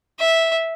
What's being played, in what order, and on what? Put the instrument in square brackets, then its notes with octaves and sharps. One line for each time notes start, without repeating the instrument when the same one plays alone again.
[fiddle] E5